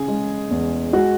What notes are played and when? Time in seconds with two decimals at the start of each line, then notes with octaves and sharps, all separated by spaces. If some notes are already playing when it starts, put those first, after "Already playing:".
Already playing: C#3 G#4
0.08 G#3
0.51 E2
0.93 G#3 F#4